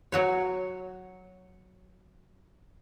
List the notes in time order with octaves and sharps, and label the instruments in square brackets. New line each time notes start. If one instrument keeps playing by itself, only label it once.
[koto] F#3 F#4 C#5